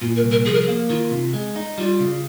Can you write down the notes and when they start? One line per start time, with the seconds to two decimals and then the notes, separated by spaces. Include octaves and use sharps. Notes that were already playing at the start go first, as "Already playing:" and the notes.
0.01 A#2 F4
0.16 A#4
0.23 C2
0.31 A#4
0.45 F3 G#4
0.53 A#4
0.61 G#4
0.68 A#3
0.89 D#3 F4
1.11 C3
1.33 G#3
1.56 D#4
1.77 G3 F4
2.00 C#3